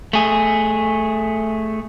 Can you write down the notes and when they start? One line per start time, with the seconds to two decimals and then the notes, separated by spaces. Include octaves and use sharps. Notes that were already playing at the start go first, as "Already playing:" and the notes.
0.13 A3 G#4